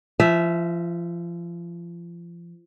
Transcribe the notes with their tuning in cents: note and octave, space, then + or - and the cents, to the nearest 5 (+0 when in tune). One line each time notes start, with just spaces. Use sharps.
F3 -30 E5 +0